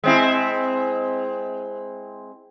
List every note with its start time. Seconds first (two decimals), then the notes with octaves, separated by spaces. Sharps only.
0.04 G#3 C4 E4